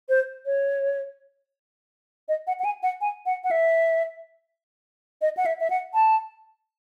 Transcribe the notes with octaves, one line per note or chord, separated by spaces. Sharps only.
C5
C#5
D#5
F#5
F#5
G#5
F#5
G#5
F#5
F#5
E5
D#5
F#5
E5
E5
F#5
A5